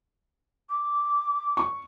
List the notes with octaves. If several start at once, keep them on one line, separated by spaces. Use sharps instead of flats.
D6
C#6